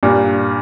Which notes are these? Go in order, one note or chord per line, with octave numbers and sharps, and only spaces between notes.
G2 A#2